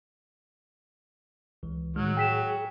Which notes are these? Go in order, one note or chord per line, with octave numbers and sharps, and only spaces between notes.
C#2 E3
A2 D#3 F#3 G#3 F6
G#4 G5 B6 E7